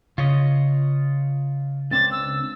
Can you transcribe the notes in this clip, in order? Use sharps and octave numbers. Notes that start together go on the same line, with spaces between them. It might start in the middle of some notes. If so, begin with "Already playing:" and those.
C#3 F4 C#5 D#5
C#2 C4 D4 A6
E6